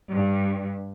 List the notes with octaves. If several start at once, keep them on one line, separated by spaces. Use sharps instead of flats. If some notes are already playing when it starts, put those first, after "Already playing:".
G2